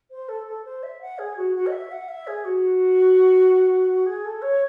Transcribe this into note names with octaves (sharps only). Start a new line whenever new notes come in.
C5
A4
A4
C5
E5
F#5
G#4
F#4
F#4
D#5
E5
F#5
E5
G#4
F#4
G#4
A4
C#5